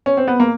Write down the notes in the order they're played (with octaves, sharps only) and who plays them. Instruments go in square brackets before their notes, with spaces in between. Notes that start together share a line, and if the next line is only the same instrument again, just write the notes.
[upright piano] C#4
C4
B3
A#3